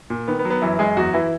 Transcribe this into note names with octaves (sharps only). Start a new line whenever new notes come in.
A#2
D#3 B3
B3
F#3
B3
F#2 E3 E4
F#2 G#3 G#4
E2 F#3 F#4
E3 E4